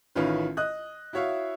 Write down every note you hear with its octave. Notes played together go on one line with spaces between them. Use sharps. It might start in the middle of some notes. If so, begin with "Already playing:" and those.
A1 D#3 C#4 E4 F4 B4
D#5 D#6 F#6
E4 F#4 C#5 E5 F5